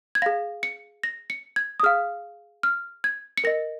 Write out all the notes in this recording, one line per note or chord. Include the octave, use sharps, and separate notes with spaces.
G#6
G#4 F5 A#6
C#7
A#6
C#7
G#6
D#6
G#4 F5 F6
F6
G#6
C#7
A#4 D#5 A#6